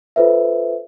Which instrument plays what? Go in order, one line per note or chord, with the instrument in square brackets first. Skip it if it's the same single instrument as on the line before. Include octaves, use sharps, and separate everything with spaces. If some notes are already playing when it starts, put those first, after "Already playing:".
[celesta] F4 A4 B4 C5 E5